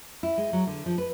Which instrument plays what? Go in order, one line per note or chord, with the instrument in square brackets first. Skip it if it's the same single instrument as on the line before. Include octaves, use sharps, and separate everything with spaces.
[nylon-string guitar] E4
G#3
F#3
D3
F3
B4